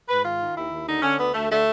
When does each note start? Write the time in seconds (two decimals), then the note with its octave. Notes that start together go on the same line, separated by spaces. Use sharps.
0.09 G#2 B4
0.24 D#3 F4
0.40 D#3
0.56 D#2 E4
0.71 D#2
0.87 D3 D#4
1.02 D3 C#4
1.18 D2 B3
1.34 D2 A3
1.50 D3 A3